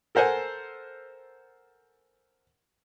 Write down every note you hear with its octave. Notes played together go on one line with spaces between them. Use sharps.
A4 A#4 C5 F#5 G#5